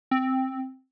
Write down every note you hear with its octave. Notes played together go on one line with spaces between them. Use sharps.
C4